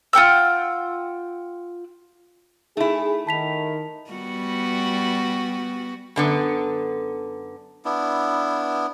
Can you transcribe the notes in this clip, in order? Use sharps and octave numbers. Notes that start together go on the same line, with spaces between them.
F4 F#5 G5 E6
A3 D#4 E4 G#4
D#3 A5 B6 F7
G3 B3 F#4
F#2 D3 B3
B3 D4 E4